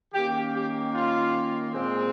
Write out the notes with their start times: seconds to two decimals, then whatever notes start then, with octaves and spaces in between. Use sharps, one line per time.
0.13 D#3 A#3 C#4 G4
0.54 G4
0.93 F4
1.73 A#2 G#3 C4